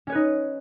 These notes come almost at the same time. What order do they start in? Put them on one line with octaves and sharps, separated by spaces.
C#4 C#5 B4 D#4